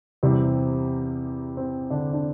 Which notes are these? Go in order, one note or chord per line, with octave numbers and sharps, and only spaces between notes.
E2 C3 G3 C4
C4
D3 D4
D4